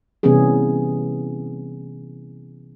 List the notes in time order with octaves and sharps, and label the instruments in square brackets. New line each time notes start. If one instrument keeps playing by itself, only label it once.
[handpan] C3 E3 G3 B3 C#4 G#4